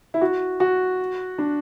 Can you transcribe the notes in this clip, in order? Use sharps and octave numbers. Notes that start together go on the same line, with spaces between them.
E4
F#4
F#4
D4